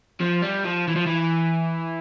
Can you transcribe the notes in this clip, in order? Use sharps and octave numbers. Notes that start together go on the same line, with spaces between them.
F3
G3
F3
E3
F3
E3